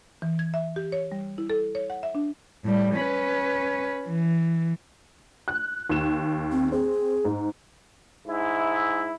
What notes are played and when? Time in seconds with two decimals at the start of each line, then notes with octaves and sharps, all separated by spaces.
0.22 E3
0.39 G#6
0.54 E5
0.76 G4
0.92 C#5
1.12 G3
1.38 E4
1.50 A4
1.75 C#5
1.90 F#5
2.03 E5
2.15 D4
2.64 A2 G3
2.96 C#4 B4
4.08 E3
5.48 F#6
5.90 D#2 E7
6.52 C4
6.72 C4 G#4
7.25 G#2
8.27 G#2 E4